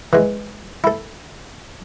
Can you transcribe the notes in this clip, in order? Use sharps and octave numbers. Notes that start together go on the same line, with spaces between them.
E3 G#3
E4 A4